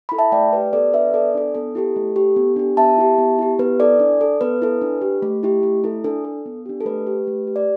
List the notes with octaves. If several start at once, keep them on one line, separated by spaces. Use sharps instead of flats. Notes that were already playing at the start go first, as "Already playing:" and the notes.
E4 A4 B5
E5 A5
A3 D5 G5
G4 B4
B3 A4 D5
D4 A4 B4 E5
B3 A4 D5
D4 A4
B3 A4
E4 G4 A4
A3
G4
B3
D4 G4
B3 E5 A5
E4 G4
B3
E4 G4
B3 B4
E4 A4 D5
D4
A4
B3 B4
E4 A4
D4
G4
A3
E4 G4
A3
E4 A4
D4 A4
A4
B3
D4 G4
A4
A3 B4
G4
A3
G4
D5